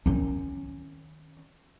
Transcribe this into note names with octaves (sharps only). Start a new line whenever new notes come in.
D#3 C#4